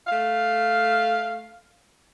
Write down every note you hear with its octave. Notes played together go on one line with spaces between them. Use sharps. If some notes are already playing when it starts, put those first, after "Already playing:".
A3 F5